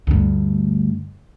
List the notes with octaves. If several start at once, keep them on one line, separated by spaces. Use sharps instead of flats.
D2 G2